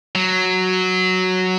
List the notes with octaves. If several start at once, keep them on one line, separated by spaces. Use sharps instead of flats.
F#3